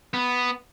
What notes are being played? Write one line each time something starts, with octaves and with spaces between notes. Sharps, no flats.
B3